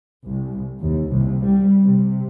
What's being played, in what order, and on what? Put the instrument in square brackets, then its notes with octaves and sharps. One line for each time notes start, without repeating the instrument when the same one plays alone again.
[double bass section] C2
D#2
C2
G3
C3